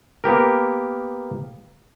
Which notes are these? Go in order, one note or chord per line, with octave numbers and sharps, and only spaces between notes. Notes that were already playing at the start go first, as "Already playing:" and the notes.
A#3 B3 G4 A#4